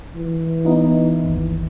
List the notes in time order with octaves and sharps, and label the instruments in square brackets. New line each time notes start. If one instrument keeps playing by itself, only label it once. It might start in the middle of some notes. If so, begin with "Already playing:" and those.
[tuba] E3
[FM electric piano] B3 D#4 E4
G1 D#2